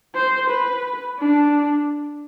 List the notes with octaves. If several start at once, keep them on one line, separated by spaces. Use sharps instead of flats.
C5
B4
D4